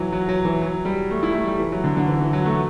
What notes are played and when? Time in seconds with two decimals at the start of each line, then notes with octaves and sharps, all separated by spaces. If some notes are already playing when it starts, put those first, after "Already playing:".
Already playing: E3 F#3
0.12 F#3
0.29 F#3
0.45 E3
0.61 F#3
0.85 G3
1.11 A3
1.23 E4
1.34 A3
1.47 G3
1.60 E3
1.72 F#3
1.84 D3
1.97 D3
2.09 E3
2.21 E3
2.33 F#3
2.46 A3